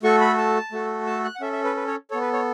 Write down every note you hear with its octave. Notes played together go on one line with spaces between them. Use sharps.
A3 F#4 A4 C#6
B5
A5
A3 F#4 A4
A5
F#6
F#5
C#4 A4 E5
E5
B4
B4
C#5
B3 A4 C#5
B4
C#5